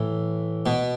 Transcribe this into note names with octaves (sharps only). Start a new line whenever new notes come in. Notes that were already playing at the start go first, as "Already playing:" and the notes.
Already playing: A2 E3
B2